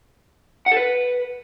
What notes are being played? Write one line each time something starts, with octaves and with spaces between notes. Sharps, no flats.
F#5
A4
B4